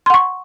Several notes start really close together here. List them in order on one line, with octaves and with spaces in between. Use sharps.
C6 F#5 C#6